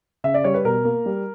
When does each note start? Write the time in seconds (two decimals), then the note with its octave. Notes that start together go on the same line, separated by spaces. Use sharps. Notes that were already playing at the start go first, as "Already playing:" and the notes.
0.24 C#3 E5
0.34 D5
0.44 G3 C#5
0.54 B4
0.64 B2 A#4
0.85 A#3
1.06 G3